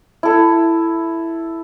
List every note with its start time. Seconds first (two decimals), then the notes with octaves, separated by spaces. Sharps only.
0.23 E4 A4